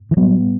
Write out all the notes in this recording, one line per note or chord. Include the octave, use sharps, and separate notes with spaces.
E3
A2 F#3 G3 B3